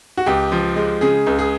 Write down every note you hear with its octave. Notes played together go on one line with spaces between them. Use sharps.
F#4
C#2 G4
F3
G#3
C#3 G#4
C#2
G#4